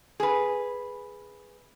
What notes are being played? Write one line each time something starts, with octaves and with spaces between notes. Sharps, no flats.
G#4 B4